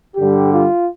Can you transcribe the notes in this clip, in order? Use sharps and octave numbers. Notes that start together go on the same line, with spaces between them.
G2 D3 G3 G4
F4